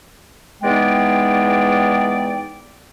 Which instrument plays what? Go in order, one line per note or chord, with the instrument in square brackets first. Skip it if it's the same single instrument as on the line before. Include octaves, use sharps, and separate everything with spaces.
[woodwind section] E2 G#3 B3 D#4 D5 G5